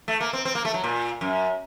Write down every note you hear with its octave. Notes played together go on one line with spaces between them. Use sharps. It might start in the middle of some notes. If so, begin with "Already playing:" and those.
A3
A#3
C4
C4
A#3
A3
F#3
A#2
F#2